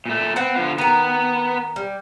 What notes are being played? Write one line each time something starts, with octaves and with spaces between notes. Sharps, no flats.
A#2 A3
B3 C4 F#5
D3 F3 F4
D#3 B3 A#4
G3